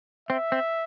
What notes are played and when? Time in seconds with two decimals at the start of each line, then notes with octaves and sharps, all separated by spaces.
0.29 C4 E5
0.52 C4